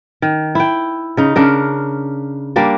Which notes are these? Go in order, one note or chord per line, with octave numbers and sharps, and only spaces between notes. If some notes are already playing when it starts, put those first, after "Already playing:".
D#3
E4 G5
C#3 D#4
C#3 D4 A#4
G3 A#3 D4